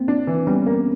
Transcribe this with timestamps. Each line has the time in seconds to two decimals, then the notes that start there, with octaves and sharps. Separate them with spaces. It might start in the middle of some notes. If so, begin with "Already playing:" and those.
Already playing: A#3 C4
0.08 D4
0.27 E3
0.47 G3 B3 C#4
0.66 A#3